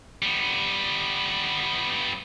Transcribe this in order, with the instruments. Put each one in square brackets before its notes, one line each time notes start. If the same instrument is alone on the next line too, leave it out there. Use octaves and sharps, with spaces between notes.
[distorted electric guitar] G3 B3